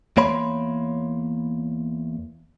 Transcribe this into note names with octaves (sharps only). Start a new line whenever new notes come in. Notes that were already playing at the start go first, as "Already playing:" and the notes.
E2 A#3 C#5 B5 C6